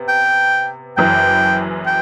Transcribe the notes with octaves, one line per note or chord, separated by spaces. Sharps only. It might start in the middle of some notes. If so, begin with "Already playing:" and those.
Already playing: C3 B3
G5
F#1 F#2 E3 G5
G5